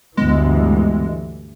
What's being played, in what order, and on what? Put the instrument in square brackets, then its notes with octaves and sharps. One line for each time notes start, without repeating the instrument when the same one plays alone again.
[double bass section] D2 G2 E3 [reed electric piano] D3 B3 [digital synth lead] G#3